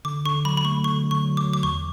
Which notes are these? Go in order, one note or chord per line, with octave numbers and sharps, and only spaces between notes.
D3 D6
D3 C#6
F#3 B5
B5
A3 C#6
D3 C#6
D3
C#6
F#3
D6
F#3
D6
E2 C#6